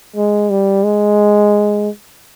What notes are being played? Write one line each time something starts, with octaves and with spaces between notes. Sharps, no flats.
G#3
G3
G#3